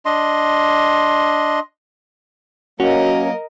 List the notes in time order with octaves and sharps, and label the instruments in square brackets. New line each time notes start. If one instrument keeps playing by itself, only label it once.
[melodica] D4 D#5 C6
[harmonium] F#3 A#3 [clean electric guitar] C#4 [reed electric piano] F#4 [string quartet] A#4 D#5